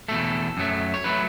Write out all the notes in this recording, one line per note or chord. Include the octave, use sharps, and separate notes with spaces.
E2 B2 A3 A4
F#2 F#3 A3
C#5
F#3 A3 B4